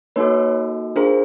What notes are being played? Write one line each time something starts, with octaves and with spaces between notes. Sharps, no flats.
A#3 D#4 F#4 A4 B4 C#5
D4 F4 G#4 A#4 C5